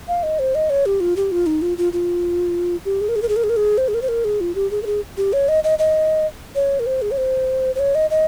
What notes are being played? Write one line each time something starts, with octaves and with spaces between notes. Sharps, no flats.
F5
D#5
C5
D#5
C#5
G4
F4
G4
F4
D#4
F4
F4
F4
G4
G#4
A#4
G#4
A#4
G#4
A#4
G#4
A#4
G#4
C5
G#4
A#4
C5
A#4
G#4
F4
G4
G#4
A#4
G#4
G4
C#5
D#5
D#5
D#5
C#5
A#4
C5
G#4
C#5
C5
C5
C#5
D#5
D#5